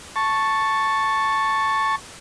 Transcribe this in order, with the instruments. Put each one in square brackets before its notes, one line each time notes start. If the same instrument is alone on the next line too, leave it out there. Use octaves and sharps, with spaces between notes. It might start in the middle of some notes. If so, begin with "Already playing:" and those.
[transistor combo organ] A5 C#6